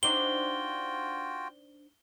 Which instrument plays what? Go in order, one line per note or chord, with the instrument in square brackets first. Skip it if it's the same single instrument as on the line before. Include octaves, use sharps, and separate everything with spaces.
[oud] C4 D4 D#4 [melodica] F4 F#4 G5 [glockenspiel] G7